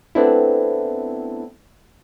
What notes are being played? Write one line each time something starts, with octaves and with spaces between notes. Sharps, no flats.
A3 B3 C4 D4 E4